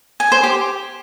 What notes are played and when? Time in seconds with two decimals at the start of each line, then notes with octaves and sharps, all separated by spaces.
0.20 G#5
0.32 C5
0.43 G4